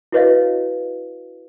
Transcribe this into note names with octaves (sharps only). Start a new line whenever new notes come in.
E4 F#4 B4 C#5 D#5 F5